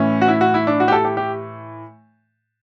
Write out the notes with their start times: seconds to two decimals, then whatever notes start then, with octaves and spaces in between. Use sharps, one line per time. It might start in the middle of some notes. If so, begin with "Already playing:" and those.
Already playing: A2 E3 C#4
0.21 F#4
0.28 E4
0.41 F#4
0.54 E4
0.67 D4
0.80 F#4
0.88 G4
0.92 A4
1.05 G4
1.17 G4